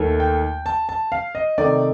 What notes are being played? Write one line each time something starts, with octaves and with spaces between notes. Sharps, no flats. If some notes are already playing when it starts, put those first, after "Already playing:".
Already playing: D#2 D#3 A3
G5
A5
A5
F5
D#5
C3 D#3 A3 D#4 D5